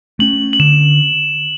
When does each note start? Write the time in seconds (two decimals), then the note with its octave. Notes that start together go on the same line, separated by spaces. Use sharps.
0.19 A3 C#4 F#7
0.53 F#7
0.59 D3 E7